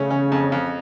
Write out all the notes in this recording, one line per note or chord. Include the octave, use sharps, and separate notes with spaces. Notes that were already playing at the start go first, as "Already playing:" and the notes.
Already playing: C#3 A3 C#4
C#4
F2
F2